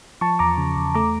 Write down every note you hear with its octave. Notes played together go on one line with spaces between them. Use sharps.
F3 A5 C#6
E2 A#5 D6
C#3
E2
A3 A#5 D6